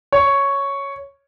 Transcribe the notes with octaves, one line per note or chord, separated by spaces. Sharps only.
C#5